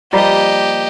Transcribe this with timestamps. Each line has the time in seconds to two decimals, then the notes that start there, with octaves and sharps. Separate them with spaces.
0.13 F3 G3 A#3 G4 D#5